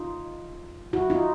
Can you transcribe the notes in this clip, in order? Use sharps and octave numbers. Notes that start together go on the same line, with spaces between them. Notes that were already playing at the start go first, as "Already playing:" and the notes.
Already playing: D#4 F4
E4 F#4
D#4 F4